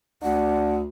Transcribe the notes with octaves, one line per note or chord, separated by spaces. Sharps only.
D2 D4 F#5